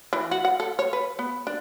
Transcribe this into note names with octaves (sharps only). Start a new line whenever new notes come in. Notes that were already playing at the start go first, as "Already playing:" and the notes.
E3
F#4
F#5
A4
C#5
B4
B3
D4